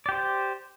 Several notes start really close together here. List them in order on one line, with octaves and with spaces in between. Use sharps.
D5 G4 C5